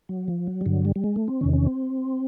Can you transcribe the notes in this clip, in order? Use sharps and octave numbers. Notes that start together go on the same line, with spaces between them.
F#3
F3
F#3
G3
G2 D3 F#3
G3
G3
G#3
A3
C4
E2 C3 D#3 C#4
C#4
C4